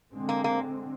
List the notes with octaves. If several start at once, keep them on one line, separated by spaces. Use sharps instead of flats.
D3 G#3 C4
A#3
A#3